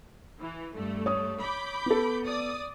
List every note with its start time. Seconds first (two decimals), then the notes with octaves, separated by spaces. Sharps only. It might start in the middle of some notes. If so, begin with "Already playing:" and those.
0.38 E3
0.74 G2 A3
1.06 C#5 D#6
1.40 B5 D6 G6
1.86 B3 A4
2.24 D5 D#6